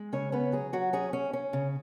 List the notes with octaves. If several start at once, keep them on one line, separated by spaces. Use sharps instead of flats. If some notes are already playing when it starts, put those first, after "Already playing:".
Already playing: G#3
C#3 C#4 C#5
B3 C#4 B4
F#3 G#4
F#3 F#4
C#4 G#4
C#4
C#4
C#3